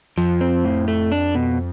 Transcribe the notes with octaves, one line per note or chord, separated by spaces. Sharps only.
F2 F3
C4
A2
A3
D4
B2